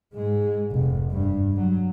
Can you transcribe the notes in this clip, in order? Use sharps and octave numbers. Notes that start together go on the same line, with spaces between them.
G#2 G#3
F1
G2
F#3